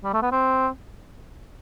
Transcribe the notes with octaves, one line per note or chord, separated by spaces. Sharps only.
G3
A3
B3
C4